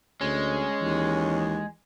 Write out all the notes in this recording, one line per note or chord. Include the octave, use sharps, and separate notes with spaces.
D2 G#3 C#4
D#2 E3